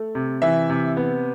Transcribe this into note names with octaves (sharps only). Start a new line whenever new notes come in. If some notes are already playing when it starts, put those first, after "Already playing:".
Already playing: A3
C3
E3 E5
C3
B3